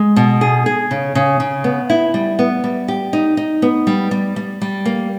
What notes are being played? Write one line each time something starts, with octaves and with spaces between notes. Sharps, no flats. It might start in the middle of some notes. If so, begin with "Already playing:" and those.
Already playing: G#3
B2
G#4
G#4
C#3
C#3
C#3
B3
E4
G3
B3
G3
G4
D#4
D#4
B3
G3
G3
G3
G3
A#3